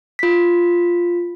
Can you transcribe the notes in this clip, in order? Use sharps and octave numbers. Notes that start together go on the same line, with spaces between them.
F4 B6